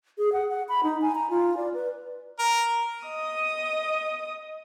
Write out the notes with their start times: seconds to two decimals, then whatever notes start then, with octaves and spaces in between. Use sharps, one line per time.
0.18 G#4
0.33 F#5
0.49 F#5
0.69 B5
0.83 D#4
1.02 G#5
1.15 A#5
1.30 F4
1.57 D5
1.74 B4
2.39 A#4
3.05 D#5 D#6